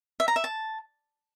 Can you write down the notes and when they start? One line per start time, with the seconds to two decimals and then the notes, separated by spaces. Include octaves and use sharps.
0.20 E5
0.28 A#5
0.36 E5
0.44 A5